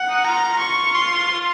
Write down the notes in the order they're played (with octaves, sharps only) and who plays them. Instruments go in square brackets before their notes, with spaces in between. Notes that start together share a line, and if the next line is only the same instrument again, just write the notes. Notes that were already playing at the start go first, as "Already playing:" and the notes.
Already playing: [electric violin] F#5
[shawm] D#4
[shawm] F4 [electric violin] A#5
[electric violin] C#6
C6